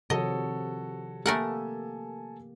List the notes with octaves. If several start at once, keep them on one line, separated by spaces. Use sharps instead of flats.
C3 D#3 F3 F#4 A4 C#5 D#5
A3 A#3 G4 A4 A#4 F#5 G#5 A5